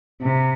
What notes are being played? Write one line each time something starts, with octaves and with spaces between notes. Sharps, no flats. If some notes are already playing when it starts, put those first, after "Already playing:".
C3